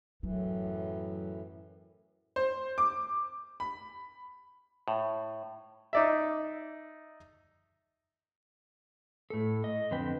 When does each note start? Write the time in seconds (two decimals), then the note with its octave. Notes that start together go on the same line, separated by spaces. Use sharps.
0.23 F#2 A2 E3 F#3
2.36 C5
2.78 D6
3.60 B5
4.88 A2
5.93 D#4 D5 E5
9.30 A2 A4
9.64 D#5
9.91 F2 D3 C4 B4 G5